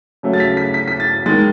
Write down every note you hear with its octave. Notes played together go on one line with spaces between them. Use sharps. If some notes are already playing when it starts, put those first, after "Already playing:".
C#3 F#3 A3
A6
B6
B6
B6
B6
A6
D#3 G#3 A6